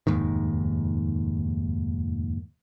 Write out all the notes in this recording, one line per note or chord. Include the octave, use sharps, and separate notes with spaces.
F1 D#2 G#2 D#3